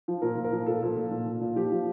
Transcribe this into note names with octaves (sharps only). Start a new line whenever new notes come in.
F3
A#2 A#4
A#2
A#4
F3
A#2 A4
A#2
A#2
A#2
A#2
A#2
F3 G4
F3